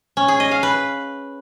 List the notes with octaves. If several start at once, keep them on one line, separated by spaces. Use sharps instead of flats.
C#4
G#4
D#5
F5
B4